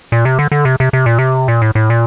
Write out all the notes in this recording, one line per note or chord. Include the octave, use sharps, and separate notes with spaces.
A#2
C3
D3
D3
C3
C3
C3
A#2
C3
A#2
A2
A2
A#2